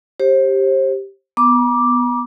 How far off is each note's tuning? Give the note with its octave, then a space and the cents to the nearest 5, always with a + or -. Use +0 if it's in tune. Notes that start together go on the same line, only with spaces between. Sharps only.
G4 +0 C5 +30
B3 +0 A#5 +45 D6 +0